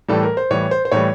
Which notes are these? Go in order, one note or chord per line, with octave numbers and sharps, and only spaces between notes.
A2 E3 G3 A4
A#4
C5
A2 E3 G3 C#5
C5
C5
A2 E3 G3 C#5